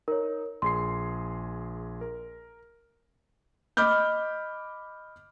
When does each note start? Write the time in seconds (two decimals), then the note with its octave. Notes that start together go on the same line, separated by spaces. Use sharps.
0.08 D#4 A#4 C#5
0.62 A#1 G#4 C6 C7
2.01 A#4
3.77 D#5 B5 D6 F6 G6